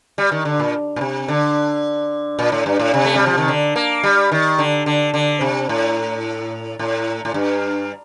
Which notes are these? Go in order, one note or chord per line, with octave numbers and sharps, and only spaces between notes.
G3
D#3
D3
A#2
A#2
C3
D3
A#2
A2
G2
A2
C3
A3
G3
F3
D#3
D3
A#3
G3
D#3
D3
D3
D3
C3
A2
A2
A2
G2